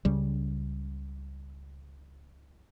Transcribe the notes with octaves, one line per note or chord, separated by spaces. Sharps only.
C#2 C#3 G3